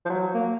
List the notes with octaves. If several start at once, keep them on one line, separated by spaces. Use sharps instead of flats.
F3
F#3
A#3